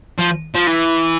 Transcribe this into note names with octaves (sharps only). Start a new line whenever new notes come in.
F3
F3
E3